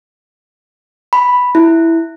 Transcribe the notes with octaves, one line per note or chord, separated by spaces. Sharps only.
B5
E4